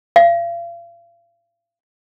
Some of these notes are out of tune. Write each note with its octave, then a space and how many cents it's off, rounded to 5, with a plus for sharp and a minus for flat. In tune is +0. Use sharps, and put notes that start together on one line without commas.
F5 -40